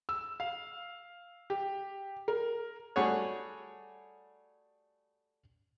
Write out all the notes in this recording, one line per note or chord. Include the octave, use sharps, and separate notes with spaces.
E6
F5
G4
A#4
G3 A3 F#4 G#4 C#5